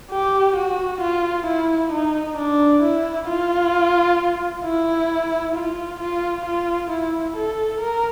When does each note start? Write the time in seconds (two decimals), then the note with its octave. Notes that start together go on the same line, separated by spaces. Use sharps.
0.11 G4
0.56 F#4
1.01 F4
1.46 E4
1.92 D#4
2.37 D4
2.83 E4
3.28 F4
4.64 E4
5.55 F4
6.00 F4
6.46 F4
6.90 E4
7.37 A4
7.81 A#4